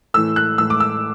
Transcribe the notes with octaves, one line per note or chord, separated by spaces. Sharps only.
A2 E3 A3 E6
F#6
A2 E3 A3 E6
D6
E6